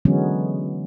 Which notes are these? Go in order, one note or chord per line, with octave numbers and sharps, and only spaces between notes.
D3 E3 F#3 G#3 B3 C#4